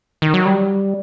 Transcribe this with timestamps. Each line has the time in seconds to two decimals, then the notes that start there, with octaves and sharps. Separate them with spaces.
0.22 D#3
0.34 F#3
0.46 G3